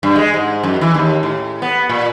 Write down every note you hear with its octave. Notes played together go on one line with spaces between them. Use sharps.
G2
G#3
G#2
F#2
E3
D#2
A2
B3
A#2